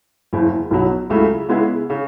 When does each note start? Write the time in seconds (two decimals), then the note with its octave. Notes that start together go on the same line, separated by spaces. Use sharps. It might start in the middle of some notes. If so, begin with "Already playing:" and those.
0.33 F#1 E2 C#3
0.71 B1 B2 F#3
1.10 C#2 C#3 F#3 A3 E4
1.49 C#3 G#3 B3 E4 G#4
1.90 C#3